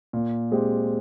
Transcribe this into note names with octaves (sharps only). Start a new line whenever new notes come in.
A#2
G#3 C4 G4